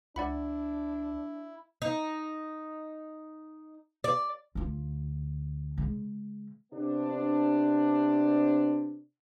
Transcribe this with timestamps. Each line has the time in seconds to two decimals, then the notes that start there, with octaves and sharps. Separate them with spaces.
0.16 C#2 D4 E4 D5 F#5 B5
1.82 D#4
4.04 D5
4.55 D2 F4
5.78 C#3 G#3
6.73 C3 B3 C4 D4